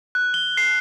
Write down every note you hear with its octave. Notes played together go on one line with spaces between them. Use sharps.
F#6
G7
C7